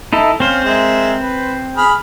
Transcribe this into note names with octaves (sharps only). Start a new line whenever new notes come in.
D#4 E4 A4
C4 C#4 C5 F5
G#3 A#4 E5
B4
G#4 B5 F6